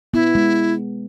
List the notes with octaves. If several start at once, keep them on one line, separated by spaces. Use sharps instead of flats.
B3 E4
G#3